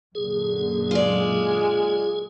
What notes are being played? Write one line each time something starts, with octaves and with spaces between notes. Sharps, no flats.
F#2 A#2 D3 G#4
G#3 F4 D5